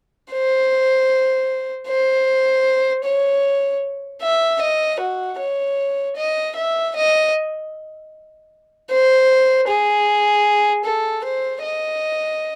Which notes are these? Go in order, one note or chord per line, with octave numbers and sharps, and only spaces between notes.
C5
C5
C#5
E5
D#5
F#4
C#5
D#5
E5
D#5
C5
G#4
A4
C5
D#5